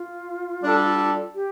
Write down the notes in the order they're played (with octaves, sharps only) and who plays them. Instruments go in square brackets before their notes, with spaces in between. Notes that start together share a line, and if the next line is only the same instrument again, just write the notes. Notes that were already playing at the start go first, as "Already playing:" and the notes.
Already playing: [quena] F4
[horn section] G3 D4 A4
[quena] G4